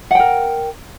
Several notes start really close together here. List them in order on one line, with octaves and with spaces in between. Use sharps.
F#5 G5 A#4